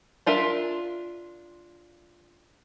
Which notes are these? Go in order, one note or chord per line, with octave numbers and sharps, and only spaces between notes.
D4 F4 A#4 E5